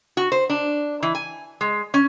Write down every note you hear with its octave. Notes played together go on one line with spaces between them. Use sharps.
F#4
C5
D4
E3
G#5
G#3
C#4